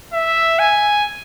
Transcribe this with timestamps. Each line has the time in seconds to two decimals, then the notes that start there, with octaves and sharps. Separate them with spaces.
0.13 E5
0.59 G#5